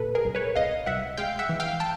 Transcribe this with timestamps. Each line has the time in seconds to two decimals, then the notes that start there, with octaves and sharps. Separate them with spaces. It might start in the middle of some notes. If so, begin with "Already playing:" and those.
Already playing: A#2 A4 B4
0.15 G#4 A#4
0.25 C2
0.35 B4 C#5
0.55 C2 D#5 F5
0.86 C2 E5 F#5
1.17 G#3 F5 G5
1.39 E5 F#5
1.49 E3
1.60 F5 G5
1.80 G5 A5